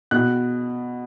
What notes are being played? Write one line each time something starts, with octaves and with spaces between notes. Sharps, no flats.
B2 F#6